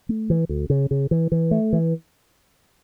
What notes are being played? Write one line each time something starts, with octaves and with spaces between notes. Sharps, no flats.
A3
E3
D2
C#3
C#3
E3
E3
A3
E3